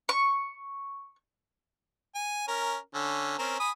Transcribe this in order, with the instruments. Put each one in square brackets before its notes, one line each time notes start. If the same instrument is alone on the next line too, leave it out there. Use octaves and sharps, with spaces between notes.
[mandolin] C#6
[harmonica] G#5
C#4 A#4
D3 C#4
C4 C#4 A#4
G#5 B5 D#6